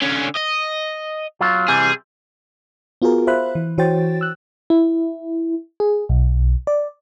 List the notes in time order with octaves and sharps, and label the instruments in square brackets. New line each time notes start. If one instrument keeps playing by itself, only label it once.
[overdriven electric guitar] D3 C#4
D#5
[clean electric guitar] F#3 F4
[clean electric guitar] C3 E3 G3 [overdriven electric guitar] G#4
[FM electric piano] B3 F4 F#4 G#4 A#4
C5 E5 F5 B5 F#6
E3
E3 F#4 C5 C#5 G5 A6
E6 F#6
E4
G#4
B1
D5